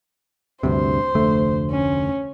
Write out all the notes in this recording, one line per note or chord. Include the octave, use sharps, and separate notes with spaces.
D2 G2 C3 C5
F1 D2 A3
C#4